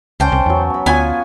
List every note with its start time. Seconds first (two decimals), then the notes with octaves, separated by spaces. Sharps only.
0.20 C#2 C#4 C5 G5 A5 D6
0.32 C2
0.46 E2 F#3 B3
0.70 A#5 B5
0.86 D2 B3 F4 F#4 G#5